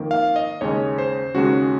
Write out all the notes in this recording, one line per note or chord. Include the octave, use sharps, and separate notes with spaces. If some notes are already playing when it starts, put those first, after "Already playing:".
Already playing: F2 D#3 A#3
F5
D#5
D#2 C#3 G#3 C#4 C#5
C5
D#2 C#3 G#3 C#4 F#4